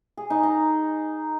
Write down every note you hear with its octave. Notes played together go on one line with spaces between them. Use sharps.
G#4
D#4
A#5